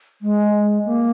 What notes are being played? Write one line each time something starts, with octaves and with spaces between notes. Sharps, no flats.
G#3
A#3